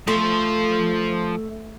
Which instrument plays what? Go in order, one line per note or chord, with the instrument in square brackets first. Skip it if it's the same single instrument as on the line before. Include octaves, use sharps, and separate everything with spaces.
[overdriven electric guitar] F3 C5 [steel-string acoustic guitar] A3